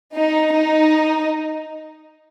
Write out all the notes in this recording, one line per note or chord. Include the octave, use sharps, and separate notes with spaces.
D#4
D#4